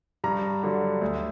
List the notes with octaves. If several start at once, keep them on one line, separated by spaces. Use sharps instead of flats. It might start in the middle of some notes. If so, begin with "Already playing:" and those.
G2 A#5
D3 F#3
D2